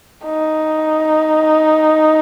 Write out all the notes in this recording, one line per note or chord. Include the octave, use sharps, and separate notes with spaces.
D#4